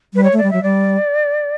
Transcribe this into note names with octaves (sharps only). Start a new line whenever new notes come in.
G3 B4
C#5
A3
G3 D5
F#3 E5
G3 D5